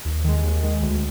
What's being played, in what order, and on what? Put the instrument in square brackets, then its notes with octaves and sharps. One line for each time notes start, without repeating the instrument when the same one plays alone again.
[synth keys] D#2
D#3 G#3
D#2
D#3 G#3
D2